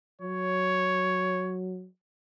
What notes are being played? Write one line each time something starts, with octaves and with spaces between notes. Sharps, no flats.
F#3 C#5